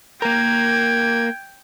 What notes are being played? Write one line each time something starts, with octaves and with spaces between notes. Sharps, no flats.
A#3 A#4 G5 G#6